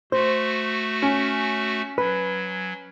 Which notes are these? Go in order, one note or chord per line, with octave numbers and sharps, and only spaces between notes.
A3 F#4 C5
C#4
F#3 B4